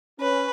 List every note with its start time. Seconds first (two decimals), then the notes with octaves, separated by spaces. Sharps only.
0.20 C#4 B4